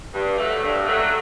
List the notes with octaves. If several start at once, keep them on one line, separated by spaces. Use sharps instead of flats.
G2
F#3 A3
G2
F#3 A3